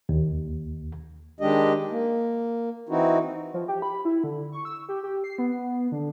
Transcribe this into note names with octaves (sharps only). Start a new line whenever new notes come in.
D#2
D#3 G#3 D4 G4 D#5
A#3
E3 C4 D#4 E4 F#4
F3
G4
B5
E4
D3
C#6
E6
G4
G4
C7
B3
D3